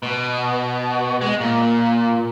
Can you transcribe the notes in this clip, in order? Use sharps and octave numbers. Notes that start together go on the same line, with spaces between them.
B2
G#3
A#2